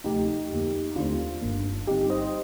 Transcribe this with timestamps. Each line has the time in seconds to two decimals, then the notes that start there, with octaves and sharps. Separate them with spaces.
0.04 D2 C3 F3 A3 D#4 G4
0.51 F2 D3 F3 A#3
0.96 D#2 D3 A3 C4 D4 F4
1.42 G1 G2 D#3 A#3
1.86 G1 G2 D3 G3 C4 D#4 G4
2.10 C5 D#5